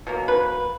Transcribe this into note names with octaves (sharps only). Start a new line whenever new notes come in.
B2 F#3 A#3
B4